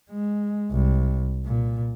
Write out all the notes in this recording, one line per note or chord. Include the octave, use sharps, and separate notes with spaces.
G#3
C2
A#2